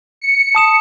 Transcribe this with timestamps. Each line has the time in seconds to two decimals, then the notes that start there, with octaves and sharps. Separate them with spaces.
0.21 C#7
0.55 A5 D#6 E7